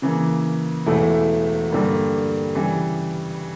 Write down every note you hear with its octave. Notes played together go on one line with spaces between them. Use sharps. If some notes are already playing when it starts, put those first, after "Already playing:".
C#3 E3 A#3
E1 E2 E3 A3 E4
G2 D3 G3 A#3
C#3 E3 G3